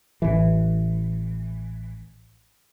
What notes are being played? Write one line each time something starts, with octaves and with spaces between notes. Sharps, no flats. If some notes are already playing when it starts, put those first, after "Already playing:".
A1 E3